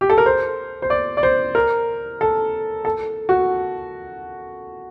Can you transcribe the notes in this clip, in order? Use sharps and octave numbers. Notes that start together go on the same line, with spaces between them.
G4
A4
A#4
C5
C5
D5
D5
C5
A#4
A4
A4
F#4